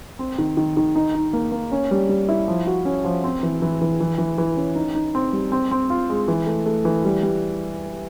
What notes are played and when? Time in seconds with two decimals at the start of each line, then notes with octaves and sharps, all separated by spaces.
0.19 C4
0.38 D#3
0.57 D#3
0.77 D#3
0.96 D#4
1.14 D#4
1.33 A#3
1.52 A#3
1.72 C#4
1.91 G3
2.09 G3
2.29 E4
2.48 F3
2.67 F#4
2.85 C#4
3.05 F3
3.24 C4
3.43 E3
3.62 E3
3.81 E3
4.01 E3
4.18 E3
4.38 E3
4.57 C#4
4.75 D#4
4.95 D#4
5.15 C4
5.33 G3
5.52 C4
5.71 C4
5.90 F4
6.09 G#3
6.28 E3
6.47 A3
6.66 A3
6.85 E3
7.05 G3
7.23 G3